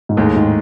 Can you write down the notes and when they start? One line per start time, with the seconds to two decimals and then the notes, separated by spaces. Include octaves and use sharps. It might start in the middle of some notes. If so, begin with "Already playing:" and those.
0.09 G#2
0.17 D#2 A2 D#3 G#3
0.36 G#2